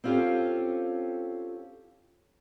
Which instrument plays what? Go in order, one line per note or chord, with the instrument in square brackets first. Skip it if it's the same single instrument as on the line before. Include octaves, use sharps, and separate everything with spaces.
[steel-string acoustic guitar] C4 C#4 F4 G4 A4